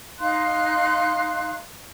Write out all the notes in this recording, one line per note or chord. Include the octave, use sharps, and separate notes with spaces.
D#4 F5 C6 F#6